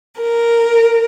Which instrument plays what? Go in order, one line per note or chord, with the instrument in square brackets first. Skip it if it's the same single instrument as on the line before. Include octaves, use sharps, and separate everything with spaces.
[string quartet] A#4